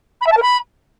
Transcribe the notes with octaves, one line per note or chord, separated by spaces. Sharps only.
B5
E5
A5
A#4
B5